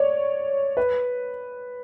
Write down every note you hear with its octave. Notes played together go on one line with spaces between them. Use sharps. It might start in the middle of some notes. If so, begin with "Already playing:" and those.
Already playing: C#5 D5
B4